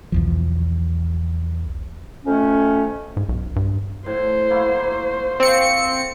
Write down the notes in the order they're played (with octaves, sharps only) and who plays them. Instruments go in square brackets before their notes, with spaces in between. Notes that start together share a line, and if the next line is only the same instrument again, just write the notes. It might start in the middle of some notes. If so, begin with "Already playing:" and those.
[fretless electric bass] B1 E2 F3
[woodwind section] F2 A3 C#4
[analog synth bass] G#2
B1
G2
[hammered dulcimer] A2 [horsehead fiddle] C5
[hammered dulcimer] A#3 E4 F#4
[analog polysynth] C4 C#7 [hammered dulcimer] A4 F5 C#6